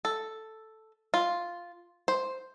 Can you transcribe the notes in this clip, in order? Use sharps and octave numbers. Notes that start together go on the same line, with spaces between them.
A4
F4
C5